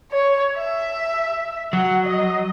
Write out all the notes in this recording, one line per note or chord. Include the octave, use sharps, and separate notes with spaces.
C#5
E5
F#3 F#5
D#5